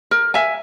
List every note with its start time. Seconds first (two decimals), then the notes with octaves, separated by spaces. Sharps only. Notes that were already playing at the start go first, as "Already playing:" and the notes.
0.11 A#4
0.34 E5 G#5